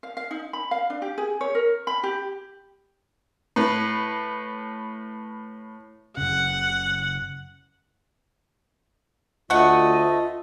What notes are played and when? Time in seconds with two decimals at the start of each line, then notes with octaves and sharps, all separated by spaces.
0.03 F5
0.17 F5
0.31 D#4
0.53 B5
0.71 F5
0.90 D4
1.02 G4
1.18 G#4
1.41 C#5
1.55 A#4
1.87 B5
2.03 G4
3.56 A2 B4
6.17 F#1 C#3 F#5
9.50 D2 A3 F4 D#5 F#5